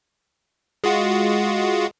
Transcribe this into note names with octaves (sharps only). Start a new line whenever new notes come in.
G#3 F4 F#4